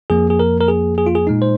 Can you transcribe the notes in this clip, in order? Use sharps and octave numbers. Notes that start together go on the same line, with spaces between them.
F2 F3 A#3 G#4
G#4
A#4
A#4
G#4
G#4
F4
G#4
A#2 G#3 D#4
C5